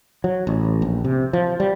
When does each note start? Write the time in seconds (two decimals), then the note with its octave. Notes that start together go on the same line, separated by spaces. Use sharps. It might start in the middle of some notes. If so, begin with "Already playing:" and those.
0.24 F#3
0.47 A1
0.82 A#1
1.04 C3
1.33 F3
1.60 G3